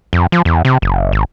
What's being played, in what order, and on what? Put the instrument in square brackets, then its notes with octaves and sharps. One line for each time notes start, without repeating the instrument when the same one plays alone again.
[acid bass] F2
F3
E2
C3
F#1
G#1